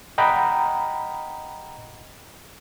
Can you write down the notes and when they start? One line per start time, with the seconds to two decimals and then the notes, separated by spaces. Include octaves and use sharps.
0.18 D#5 F#5 G5 A#5 B5